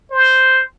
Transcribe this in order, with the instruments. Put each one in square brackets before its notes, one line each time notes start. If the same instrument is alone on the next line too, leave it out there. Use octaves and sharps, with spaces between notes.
[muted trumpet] C5